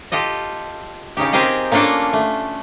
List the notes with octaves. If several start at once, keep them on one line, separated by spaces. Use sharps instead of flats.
F4 G4 A4 D#5
C#3 C#4 D#4 G4
C4 G4 G#4 A#4 D#5 F5
A#3 C#4 D4 F4 A4 A#4
A3